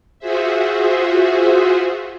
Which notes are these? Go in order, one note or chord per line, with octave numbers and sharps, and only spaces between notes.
F4 F#4 G#4 C5 E5